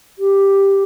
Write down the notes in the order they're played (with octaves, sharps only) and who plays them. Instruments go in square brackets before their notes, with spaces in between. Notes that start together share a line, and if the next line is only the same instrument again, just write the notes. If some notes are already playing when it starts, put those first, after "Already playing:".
[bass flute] G4